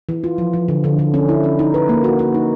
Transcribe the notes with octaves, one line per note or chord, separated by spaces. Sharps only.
E3
F4
F3
F3
D3
D3
D3
C#4
E4
C#4
D#4
B4
A#3
F#4
F#4
D#4